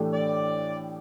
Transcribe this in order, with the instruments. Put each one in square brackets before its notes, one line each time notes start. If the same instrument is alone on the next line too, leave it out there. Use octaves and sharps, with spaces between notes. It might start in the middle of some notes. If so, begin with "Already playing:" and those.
Already playing: [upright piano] A2 E3 A3 D4 G4
[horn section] D5